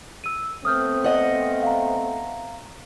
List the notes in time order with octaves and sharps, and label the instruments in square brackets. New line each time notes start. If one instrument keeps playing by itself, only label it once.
[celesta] E6 D#7
[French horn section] A3 B3 C4 [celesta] D#6 F6 G6
[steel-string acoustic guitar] D#5 F#5
[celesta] F5 A#5